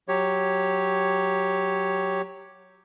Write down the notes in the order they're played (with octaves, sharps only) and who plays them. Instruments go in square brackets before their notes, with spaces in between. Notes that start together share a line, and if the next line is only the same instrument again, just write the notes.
[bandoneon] F#3 G4 C#5